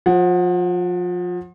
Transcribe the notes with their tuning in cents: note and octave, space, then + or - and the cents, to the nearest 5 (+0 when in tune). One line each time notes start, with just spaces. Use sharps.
F3 +30 F#5 -10